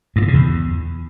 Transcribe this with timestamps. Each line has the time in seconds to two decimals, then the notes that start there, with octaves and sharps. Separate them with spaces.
0.16 G2
0.22 A#2
0.28 C#3
0.34 E2